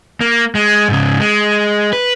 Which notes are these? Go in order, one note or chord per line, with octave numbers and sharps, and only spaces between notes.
A#3
G#3
G#2 C#3
G#3
B4